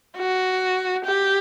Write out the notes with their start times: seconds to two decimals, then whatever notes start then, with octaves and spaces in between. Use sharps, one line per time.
0.17 F#4
1.05 G4